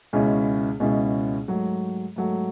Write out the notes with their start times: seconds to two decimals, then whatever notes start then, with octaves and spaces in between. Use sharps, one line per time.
0.13 C#2 B2 G#3 C#4 E4
0.80 C#2 B2 G#3 C#4 E4
1.48 G#2 F#3 A3
2.16 G#2 F#3 A3